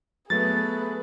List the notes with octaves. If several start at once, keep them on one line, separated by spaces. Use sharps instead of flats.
F#3 A3 B3 G#4 B4 A6